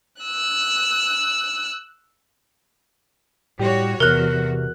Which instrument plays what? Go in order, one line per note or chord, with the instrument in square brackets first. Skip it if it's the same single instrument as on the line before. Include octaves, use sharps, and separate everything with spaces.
[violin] E6 F#6
[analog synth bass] A2 [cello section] G3 F#4 C#5 [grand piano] G4
[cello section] E2 F#4 [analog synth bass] C3 [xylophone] A#4 [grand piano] F6 F#6